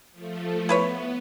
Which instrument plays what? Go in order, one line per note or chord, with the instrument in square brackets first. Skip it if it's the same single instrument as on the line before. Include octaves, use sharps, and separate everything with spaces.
[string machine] F3 A3
[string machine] B3 [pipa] E4 B4 C#5